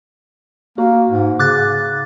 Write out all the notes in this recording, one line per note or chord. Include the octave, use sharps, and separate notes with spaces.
A#3 F#4
G#2
C#3 D6 F#6 A6